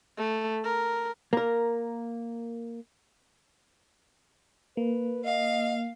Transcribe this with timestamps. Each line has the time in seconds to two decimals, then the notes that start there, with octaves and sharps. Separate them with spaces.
0.18 A3
0.64 A#4
1.33 A#3 A#4
4.77 A#3 B4
5.25 D#5 F5